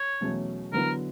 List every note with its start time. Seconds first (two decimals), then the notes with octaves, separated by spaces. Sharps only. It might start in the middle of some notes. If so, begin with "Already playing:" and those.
Already playing: C#5
0.20 E2 B2 F#3 A3 C#4
0.72 D3 F#3 B3 E4 A#4